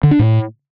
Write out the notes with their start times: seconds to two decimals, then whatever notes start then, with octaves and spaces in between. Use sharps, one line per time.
0.03 D3
0.11 D4
0.19 A2